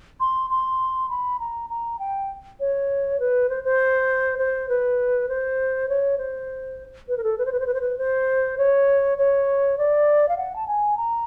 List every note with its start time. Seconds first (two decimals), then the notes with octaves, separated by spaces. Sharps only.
0.20 C6
0.50 C6
1.10 B5
1.40 A#5
1.70 A#5
1.99 G5
2.60 C#5
3.20 B4
3.49 C5
3.64 C5
4.39 C5
4.69 B4
5.29 C5
5.89 C#5
6.18 C5
7.08 B4
7.18 A#4
7.24 A4
7.38 B4
7.46 C5
7.53 B4
7.60 C5
7.67 B4
7.74 C5
7.81 B4
7.98 C5
8.58 C#5
9.18 C#5
9.78 D5
10.29 F5
10.37 F#5
10.56 A5
10.67 G#5
10.97 A#5